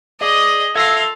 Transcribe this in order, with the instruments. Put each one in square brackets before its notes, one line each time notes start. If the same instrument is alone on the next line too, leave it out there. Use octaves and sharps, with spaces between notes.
[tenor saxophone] G#4 [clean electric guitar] D5 [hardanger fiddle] D#5
[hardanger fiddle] F4 F5 [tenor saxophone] A4 [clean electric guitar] E5 [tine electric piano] G#6 A#6 C7